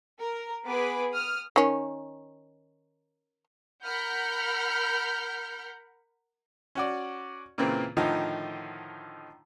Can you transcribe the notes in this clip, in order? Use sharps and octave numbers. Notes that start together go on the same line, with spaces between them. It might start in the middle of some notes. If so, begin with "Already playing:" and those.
A#4
B3 G#4 B4 D6
D#6 F6
D#3 C#4
A#4 F#5 B5 F6 G6
C#4 F#4 D5
A#2 C#3 E3 A#3 C4
A2 D3 D#3 F3 D#4